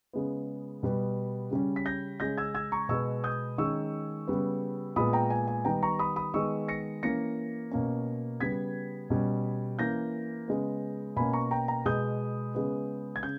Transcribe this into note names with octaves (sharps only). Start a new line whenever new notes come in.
C#3 G#3 B3
B2 G3 B3
C#3 G3 C#4
B6
G6 A#6
C#3 G#3 C#4 G6 A#6
E6 G#6
E6 G#6
A#5 C#6
B2 G#3 B3 C#6 E6
D#6 G6
D#3 G#3 C#4 C#6 E6
C#3 G3 B3
A#2 G#3 B3 B5 D#6
G5 A#5
G#5
G#5
D#3 G3 B3 G5 A#5
A#5 C#6
B5 D#6
B5 D#6
D#3 G#3 B3 C#6 E6
A#6 C#7
E3 A#3 C#4 A#6 C#7
B2 A#3 C#4
C#3 G3 B3 G#6 B6
B2 G3 C#4
E3 A#3 C#4 G6 A#6
C#3 G#3 B3
B2 A#3 C#4 G#5 B5
A#5 C#6
G5 A#5
G5 A#5
B2 G#3 B3 D#6 G6
C#3 G#3 B3
G#6
C#3 G6